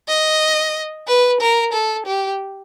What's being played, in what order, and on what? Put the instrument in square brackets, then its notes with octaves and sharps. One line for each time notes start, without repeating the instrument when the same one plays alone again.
[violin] D#5
B4
A#4
A4
G4